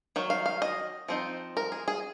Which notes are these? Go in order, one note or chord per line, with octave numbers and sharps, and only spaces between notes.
D#3 F#3
F5
F5
D#5
F3 C4 D#4
A#4
G#4
G#4